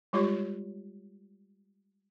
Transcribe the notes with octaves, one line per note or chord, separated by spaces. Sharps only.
G3 G#3 F4 G4 C#5